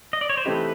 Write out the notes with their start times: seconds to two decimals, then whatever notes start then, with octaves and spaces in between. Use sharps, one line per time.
0.13 D#5
0.21 D5
0.30 C#5
0.37 C5
0.45 E3 A3 C4 D#4 G4 B4